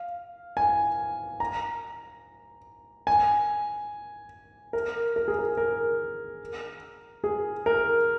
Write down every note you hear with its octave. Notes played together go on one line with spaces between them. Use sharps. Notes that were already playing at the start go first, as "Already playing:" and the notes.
Already playing: F5
G#5
A#5
G#5
A#4
A#4
G#4
A#4
A#4
G#4
A#4